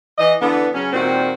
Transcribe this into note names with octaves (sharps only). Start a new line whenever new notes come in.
E3 D#5
D3 E3 B3
C#3 F#3 C#4
A#2 D#3 G3 C4 F#4